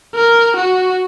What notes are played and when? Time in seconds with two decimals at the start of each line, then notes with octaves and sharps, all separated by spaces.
0.15 A#4
0.56 F#4